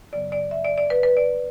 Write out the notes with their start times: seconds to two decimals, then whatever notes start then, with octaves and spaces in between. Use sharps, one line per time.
0.13 F#2 C#3 F#3 B3 D5
0.32 D5
0.51 E5
0.65 D5
0.78 D5
0.90 B4
1.03 B4
1.17 D5